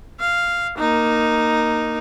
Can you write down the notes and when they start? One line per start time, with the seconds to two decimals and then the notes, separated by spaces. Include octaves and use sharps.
0.20 F5
0.78 A#3 D#4